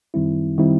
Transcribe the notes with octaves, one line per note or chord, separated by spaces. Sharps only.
F#2 D#3 G3 C4 E4
D#3 G3 C4 E4